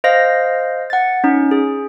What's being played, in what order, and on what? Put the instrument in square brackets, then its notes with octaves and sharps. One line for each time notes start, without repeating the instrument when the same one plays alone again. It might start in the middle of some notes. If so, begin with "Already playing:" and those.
[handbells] C5 D#5 F5 A#6
F#5 A6
C#4 D#4
G#4